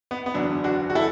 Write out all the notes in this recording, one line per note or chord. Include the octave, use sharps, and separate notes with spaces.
B3
B3
F#1 E2 D3 F#3 D4
D4 F#4
F#4
E4 A4